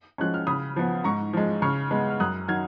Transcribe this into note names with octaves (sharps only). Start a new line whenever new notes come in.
F3 G#3 C#4 F#6
F6
C#3 B5 D#6
F3 B3
G#2 A#5 C#6
F3 G#3
C#3 C#6 F6
G#3 B3
F6
F#2 D#6 F#6
D#3 F#3 F6 G#6